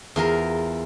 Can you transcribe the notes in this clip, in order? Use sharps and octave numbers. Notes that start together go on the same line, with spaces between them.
E2 F4 A#4